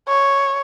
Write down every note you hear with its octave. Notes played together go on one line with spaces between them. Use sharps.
C#5